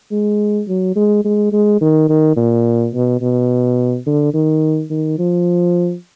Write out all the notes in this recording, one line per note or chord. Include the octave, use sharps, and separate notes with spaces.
G#3
F#3
G#3
G#3
G#3
D#3
D#3
A#2
B2
B2
D3
D#3
D#3
F3